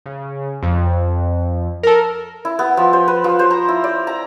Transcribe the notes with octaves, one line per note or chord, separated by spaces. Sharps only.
C#3
F2
A4 A#4
E4
B3
F3
C5
B4
F3
C5
A#5
E4
D5
A#5